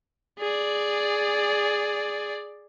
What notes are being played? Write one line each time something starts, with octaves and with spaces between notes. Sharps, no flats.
G#4 D5